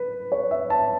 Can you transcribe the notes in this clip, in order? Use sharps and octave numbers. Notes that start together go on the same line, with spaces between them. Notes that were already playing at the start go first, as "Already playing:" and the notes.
Already playing: B4
C#5
E5
A5